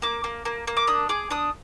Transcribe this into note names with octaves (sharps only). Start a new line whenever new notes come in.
A#3 D6
A#3
A#3
A#3
D6
D4 D#6
G#4 D6
D4 D#6